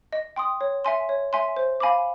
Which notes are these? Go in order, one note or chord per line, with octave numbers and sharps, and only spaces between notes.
D#5
G5 C6 D#6
C#5
E5 G#5 C6
C#5
E5 G#5 C6
C5
F5 G#5 B5 D6